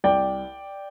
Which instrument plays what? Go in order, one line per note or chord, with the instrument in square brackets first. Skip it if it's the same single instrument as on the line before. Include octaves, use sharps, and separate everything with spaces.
[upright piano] C2 D5 G5